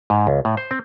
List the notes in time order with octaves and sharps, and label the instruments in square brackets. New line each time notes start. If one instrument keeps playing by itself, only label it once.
[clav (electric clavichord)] G#2
C#2
A2
C5
C4